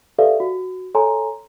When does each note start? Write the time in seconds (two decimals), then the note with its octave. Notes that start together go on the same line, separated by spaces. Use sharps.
0.18 G4 A4 B4 D5 E5 F5
0.40 F#4
0.94 A4 C#5 G#5 A#5 C6